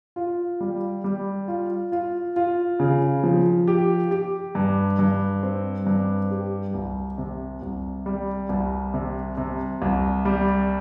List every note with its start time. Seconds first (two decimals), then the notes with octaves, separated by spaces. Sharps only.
0.16 F4
0.60 G3
1.04 G3
1.48 F4
1.92 F4
2.36 F4
2.80 C#3
3.24 F3
3.68 G4
4.11 G4
4.55 G2
4.99 G2
5.43 C4
5.86 G2
6.31 G4
6.74 C2
7.18 C3
7.62 C2
8.06 G3
8.49 C2
8.94 C3
9.37 C3
9.82 C2
10.25 G3